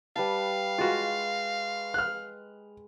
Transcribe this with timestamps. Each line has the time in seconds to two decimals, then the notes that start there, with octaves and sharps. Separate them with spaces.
0.16 G3 B4 F5 A5
0.78 G#3 F4 F#4
1.94 F6 F#6